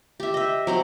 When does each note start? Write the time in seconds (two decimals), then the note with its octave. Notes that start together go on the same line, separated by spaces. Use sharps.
0.20 G4 E5
0.34 D#5 E5
0.67 F#3 C4 C5